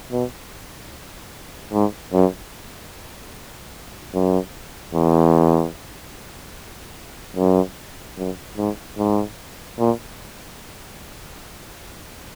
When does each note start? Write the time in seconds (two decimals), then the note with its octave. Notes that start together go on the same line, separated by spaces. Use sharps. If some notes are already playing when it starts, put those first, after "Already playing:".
0.12 B2
1.73 G#2
2.13 F#2
4.14 F#2
4.94 E2
7.36 F#2
8.18 F#2
8.57 G#2
8.98 G#2
9.79 A#2